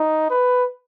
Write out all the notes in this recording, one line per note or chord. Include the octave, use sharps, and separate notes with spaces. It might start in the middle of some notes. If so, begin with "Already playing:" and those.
Already playing: D#4
B4